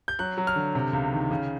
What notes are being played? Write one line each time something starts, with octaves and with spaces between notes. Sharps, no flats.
G6
F#3 F#6
F#3
F6
D3
C3
C#2
D#3
C#3